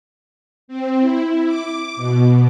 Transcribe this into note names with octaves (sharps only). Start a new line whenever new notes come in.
C4
E4
D6
B2